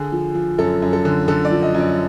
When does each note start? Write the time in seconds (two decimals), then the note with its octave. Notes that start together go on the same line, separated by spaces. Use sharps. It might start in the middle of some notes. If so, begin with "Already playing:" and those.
Already playing: D3 G#4
0.12 F3
0.35 F3
0.58 F#2 A4
0.82 F#2
0.93 A4
1.05 D3
1.28 D3 A4
1.45 D5
1.51 F3
1.63 D#5
1.74 F#2
1.80 D5